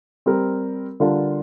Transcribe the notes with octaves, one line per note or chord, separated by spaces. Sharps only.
G3 C4 G4 A#4
D3 G3 D4 F4 A#4